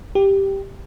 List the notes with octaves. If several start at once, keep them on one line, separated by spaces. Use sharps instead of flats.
G4